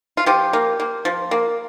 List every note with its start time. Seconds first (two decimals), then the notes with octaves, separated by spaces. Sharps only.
0.17 F4
0.26 F3 G4
0.53 A#3
0.80 A#3
1.05 F3
1.31 A#3